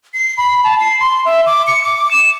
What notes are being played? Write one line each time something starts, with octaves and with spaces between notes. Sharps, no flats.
C7
B5
A5
C7
C6
E5
D6
C#7
D6
E7